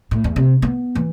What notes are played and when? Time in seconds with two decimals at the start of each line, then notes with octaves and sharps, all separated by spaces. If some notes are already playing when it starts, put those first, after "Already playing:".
0.11 A2
0.24 E2
0.36 C3
0.62 B3
0.95 E3